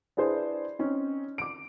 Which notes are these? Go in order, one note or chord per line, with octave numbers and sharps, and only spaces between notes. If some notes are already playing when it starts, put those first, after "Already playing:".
D4 E4 G#4 B4 C5 D5
C4 C#4 D#4
D6 D7